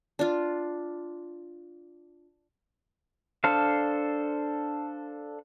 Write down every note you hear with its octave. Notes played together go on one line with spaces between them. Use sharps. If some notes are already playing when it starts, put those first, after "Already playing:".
D4 F4
D4 A4 C5 F5